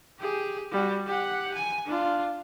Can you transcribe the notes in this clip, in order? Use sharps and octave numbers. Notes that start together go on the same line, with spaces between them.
G4 G#4
G3 F#4
G4 F#5
G#5
D4 F4